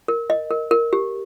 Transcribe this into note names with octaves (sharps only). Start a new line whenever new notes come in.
A#4
D#5
A#4
A#4
G4